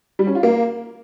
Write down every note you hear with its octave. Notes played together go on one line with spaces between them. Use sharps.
G3
C#4
F4
A#3